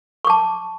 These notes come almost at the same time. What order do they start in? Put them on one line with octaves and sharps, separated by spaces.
C#6 D6 A5